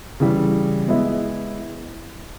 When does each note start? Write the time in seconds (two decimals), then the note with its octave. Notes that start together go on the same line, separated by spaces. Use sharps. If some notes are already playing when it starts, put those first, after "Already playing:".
0.20 C#3 E3 G3
0.88 G#3 B3 E4